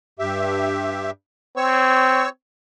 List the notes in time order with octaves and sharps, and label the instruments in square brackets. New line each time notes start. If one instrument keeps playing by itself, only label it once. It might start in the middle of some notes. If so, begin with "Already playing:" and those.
[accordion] G2 G4 E5
[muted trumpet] C4 [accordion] C#5 C#6 E6